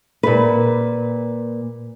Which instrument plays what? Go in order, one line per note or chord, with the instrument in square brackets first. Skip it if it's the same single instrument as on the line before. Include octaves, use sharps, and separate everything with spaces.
[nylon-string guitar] A#2 B4